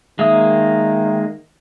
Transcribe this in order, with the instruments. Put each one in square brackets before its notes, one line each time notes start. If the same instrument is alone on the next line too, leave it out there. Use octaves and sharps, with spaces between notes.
[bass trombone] D#3 [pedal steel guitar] G#3 A#3 D#6 [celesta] E5